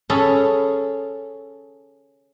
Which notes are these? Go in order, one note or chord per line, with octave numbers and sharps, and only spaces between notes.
C#4 G#4 A4 B5